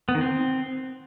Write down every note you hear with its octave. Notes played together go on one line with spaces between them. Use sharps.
B3
D#3
C4